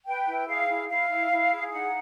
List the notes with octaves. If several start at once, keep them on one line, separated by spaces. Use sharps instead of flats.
B4 G5
E4
G#4 F5
E4
E4 F5
E4
E4
G#4
D#4 F#5